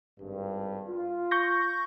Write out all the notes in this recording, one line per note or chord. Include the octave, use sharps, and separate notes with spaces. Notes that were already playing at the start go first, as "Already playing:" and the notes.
G#1 G2
F4
C#6 G6 A#6